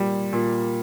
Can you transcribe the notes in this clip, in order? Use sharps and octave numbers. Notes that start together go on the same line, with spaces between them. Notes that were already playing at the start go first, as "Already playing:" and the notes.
Already playing: A#2 G3
A#2